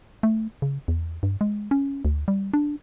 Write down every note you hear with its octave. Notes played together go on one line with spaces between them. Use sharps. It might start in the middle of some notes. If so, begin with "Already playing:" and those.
A3
C#3
E2
G2
G#3
C#4
D2
G3
D4